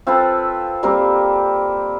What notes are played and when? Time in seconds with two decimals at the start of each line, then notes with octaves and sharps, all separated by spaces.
0.07 C4 F4 A4 B4
0.83 G3 A#3 C4 A#4